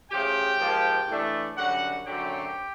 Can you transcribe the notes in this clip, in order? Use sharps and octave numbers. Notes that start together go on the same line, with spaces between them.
C#3 F3 A3 G4 G5
G#2 F3 A#3
A2 E3 A3 D4
F#2 D3 G3 F#4 F#5
F#2 D3 F#3 A3 C4 G4 G5